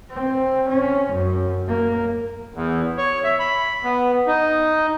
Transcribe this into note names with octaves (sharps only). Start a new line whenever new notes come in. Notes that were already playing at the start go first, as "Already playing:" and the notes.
C4
C#4
F#2
A#3
E2
C#5
E5
B5
B3
D#4